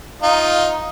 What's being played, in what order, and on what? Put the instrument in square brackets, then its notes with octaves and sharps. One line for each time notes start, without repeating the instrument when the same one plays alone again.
[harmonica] D#4 F4